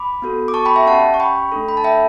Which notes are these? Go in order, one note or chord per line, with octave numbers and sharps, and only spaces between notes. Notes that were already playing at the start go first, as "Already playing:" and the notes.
Already playing: B5 D6
B3 F#4 A4
D6
A5 C#6
G5 B5
E5 G5
C#4 G4 F#5 A5
C#6
G5 B5
A3 D4 A4
B5
A5
E5 G5